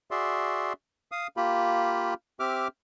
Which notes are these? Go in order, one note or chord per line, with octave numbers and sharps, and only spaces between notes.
F#4 G#4 D5 E5 C6
F5 D#6
A#3 F4 G4 B5
C4 G4 E5 D6 F6